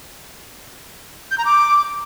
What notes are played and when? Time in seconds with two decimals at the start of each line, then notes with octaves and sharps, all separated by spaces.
1.31 G6
1.38 A#5
1.45 D6